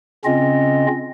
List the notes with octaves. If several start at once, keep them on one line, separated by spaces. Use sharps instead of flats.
C#3 C4 C#4 F4 D#5